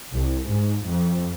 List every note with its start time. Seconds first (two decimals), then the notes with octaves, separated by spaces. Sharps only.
0.14 C2
0.48 G#2
0.86 F2